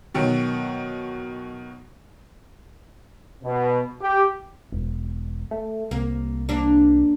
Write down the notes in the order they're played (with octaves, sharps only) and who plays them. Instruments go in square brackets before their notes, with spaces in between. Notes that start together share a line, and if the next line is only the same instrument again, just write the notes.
[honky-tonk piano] B2 D#3 F#3
[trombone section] B2
G4
[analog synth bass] E1
A3
[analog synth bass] C2 [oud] A#3
[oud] A#3 D4